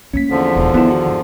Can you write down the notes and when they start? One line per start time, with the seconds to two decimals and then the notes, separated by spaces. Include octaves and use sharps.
0.13 A3 A#3 C#4 B6
0.30 E2 D3 F3
0.56 E1
0.74 D#3 B3 E4
0.90 F#4
1.07 G#1